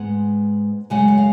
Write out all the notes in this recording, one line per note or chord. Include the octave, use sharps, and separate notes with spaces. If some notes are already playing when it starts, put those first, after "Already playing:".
Already playing: G#2 G#3 B3 F#5
F#2 C#3 G#3 F#5
F#5
F5